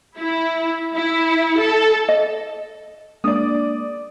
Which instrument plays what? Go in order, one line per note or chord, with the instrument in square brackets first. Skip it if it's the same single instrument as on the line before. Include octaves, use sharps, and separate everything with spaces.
[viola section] E4
E4
A4
[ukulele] D#5
[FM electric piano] G#3 A#3 D4 [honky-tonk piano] D5 D#6